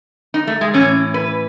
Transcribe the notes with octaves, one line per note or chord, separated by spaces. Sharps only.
D#4
A3
G#3
A2 E3 C#4
B4